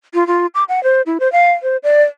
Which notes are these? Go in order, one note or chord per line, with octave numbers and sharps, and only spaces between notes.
F4
F4
D6
F#5
C5
E4
C5
F5
C5
D5